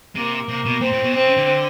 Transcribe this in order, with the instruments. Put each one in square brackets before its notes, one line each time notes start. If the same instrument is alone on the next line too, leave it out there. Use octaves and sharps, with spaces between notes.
[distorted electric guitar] C3 [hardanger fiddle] A#3
[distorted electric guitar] C3 [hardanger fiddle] A#3
[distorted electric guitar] B2
[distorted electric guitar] A#2 [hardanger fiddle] C4
[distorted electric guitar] A2
B2
[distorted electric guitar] C3 [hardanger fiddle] C4
[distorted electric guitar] C#3
D3